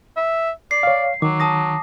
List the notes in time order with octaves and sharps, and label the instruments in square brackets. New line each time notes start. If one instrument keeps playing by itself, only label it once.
[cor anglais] E5
[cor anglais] D5 [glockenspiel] C7
[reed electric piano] C#5 F5
[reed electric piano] D#3 [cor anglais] F#3 [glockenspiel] D6
[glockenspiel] A5 D#6 A#6